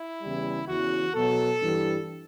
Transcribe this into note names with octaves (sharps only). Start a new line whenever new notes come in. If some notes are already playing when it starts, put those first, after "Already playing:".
Already playing: E4
E2 C#3 E3 G3
E2 C#3 E3 F#4
B2 F#3 A4
G2 E3 G3